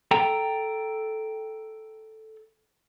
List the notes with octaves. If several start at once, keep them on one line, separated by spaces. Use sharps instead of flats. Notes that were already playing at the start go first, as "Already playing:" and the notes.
A4 G5 A#5